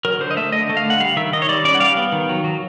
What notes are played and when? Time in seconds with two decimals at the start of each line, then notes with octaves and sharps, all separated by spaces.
0.05 F#3 A#4
0.20 D3 C5
0.31 D#5
0.37 A3 E5
0.52 D3 D#5
0.69 A3
0.77 F5
0.85 D3
0.90 F#5
1.00 G3 F5
1.16 D#3 E5
1.33 D#3 D#5
1.42 C#5
1.49 G3 D5
1.64 C#4 D5
1.75 F#5
1.80 G3 F5
1.97 B3
2.12 D#3
2.29 F#3
2.44 F#3